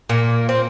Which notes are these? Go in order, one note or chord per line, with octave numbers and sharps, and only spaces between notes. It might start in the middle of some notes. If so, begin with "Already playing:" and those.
A#2 A#3
C4